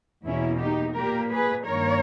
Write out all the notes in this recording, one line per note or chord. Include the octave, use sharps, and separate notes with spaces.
E2 B2 A#3 C#4 E4
D#4 G4
A#2 A#3 G4 A#4
G#4 B4
G2 D#3 A#3 A#4 C#5